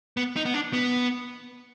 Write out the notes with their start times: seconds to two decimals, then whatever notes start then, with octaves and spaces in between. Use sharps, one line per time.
0.17 B3
0.36 D#4
0.45 B3
0.54 D4
0.73 B3